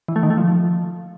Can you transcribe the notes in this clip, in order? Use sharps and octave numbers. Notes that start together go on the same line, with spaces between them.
E3
A3
D#3
A3
F3